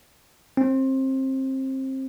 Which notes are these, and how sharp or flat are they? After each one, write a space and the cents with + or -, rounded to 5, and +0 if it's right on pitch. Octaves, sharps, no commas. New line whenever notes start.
C4 +25